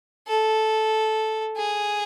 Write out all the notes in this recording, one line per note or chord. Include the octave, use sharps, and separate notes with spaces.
A4
G#4